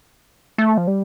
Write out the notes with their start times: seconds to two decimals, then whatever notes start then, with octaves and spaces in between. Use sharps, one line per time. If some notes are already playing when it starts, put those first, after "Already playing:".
0.58 A3
0.77 F3
0.87 G3